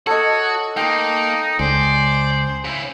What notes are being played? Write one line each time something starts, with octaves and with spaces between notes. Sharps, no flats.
F#4 A4 C#5 D#5
A#3 D#4 G5 C6 D#6
C#2 C5 D5 G#5
C#3 E4